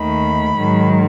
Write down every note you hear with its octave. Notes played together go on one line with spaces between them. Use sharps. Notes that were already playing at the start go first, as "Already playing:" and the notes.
Already playing: D#2 D#3 A3 B5
G#2 D#3 F#3